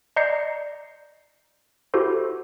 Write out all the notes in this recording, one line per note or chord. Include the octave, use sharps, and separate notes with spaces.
D5 D#5 A#5 G6 C7 C#7
E4 F#4 G4 A4 C5